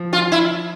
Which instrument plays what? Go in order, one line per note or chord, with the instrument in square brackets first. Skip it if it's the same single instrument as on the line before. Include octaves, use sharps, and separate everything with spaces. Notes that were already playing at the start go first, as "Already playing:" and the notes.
Already playing: [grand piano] F3
[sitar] F4
E4